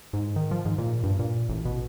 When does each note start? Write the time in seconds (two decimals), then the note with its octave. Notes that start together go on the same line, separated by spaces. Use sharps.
0.13 G#2
0.36 D#3
0.51 F3
0.65 G#2
0.78 A#2
1.03 G2
1.19 A#2
1.49 A1
1.65 B2